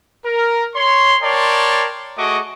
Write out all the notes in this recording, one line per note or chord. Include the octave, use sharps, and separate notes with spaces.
A#4
C#5 C6
A#4 C#5 D5 G5 A5 C6
A3 F#4 G#4 D#5 C#6 D6